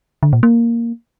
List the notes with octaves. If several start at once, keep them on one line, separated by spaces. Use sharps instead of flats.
D3
A#2
A#3